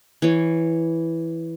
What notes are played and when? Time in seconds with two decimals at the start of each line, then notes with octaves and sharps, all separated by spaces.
0.22 E3 C#5